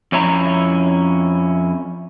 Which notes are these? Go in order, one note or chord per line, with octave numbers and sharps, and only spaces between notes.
F2 C#4 E4 A#5